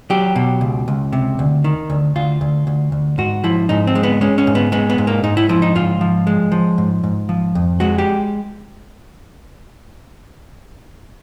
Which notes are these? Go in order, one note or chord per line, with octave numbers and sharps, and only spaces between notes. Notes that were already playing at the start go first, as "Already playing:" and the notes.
F#3 G4
B2
C#2
C#2
C3
D2
D#3
D2
D2 F4
D2
D2
D2
G#2 F#4
F3 E4
G#2 D#4
C4
G#3
B3
G#3 C#4
C#4
G#2
B3
G#3 B3
B3
G#2
A#3
G#2 D#4
E4
F3 E4
D#4
G#2 F4
F3
G#3
F3
G#2
G#2
F3
F2
G#3 F#4
G4